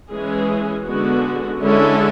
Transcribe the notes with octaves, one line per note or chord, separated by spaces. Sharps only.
E3 G#3 C#4 G#4
D3 G#3 B3 F#4
D3 G#3 C#4 E4 A4